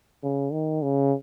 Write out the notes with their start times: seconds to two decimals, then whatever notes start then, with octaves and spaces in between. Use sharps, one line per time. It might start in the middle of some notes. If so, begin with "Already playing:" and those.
0.23 C#3
0.52 D#3
0.82 C#3